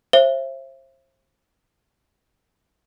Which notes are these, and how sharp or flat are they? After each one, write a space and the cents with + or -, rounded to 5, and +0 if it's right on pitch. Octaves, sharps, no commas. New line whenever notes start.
C5 +35 E5 +30